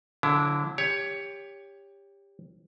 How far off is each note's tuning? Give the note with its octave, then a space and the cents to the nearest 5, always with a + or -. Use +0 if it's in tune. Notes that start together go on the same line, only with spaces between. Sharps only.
D3 -20 F#3 -35 E4 +15
G4 +20 C#5 +10